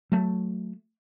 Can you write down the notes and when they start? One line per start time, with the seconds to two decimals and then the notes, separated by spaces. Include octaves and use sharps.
0.12 F#3 A3